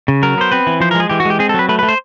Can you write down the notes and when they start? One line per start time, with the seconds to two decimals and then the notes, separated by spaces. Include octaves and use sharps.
0.08 C#3
0.23 F#3 A#4
0.38 B3 C5
0.51 C4 B4
0.67 E3
0.80 F3 C5
0.91 A#4
0.95 G#3 G#4
1.10 E3 G4
1.20 F#4
1.25 G#3 G4
1.39 C4 G#4
1.49 A4
1.54 F#3 B4
1.69 A3 B4
1.79 B4
1.83 A3
1.89 C5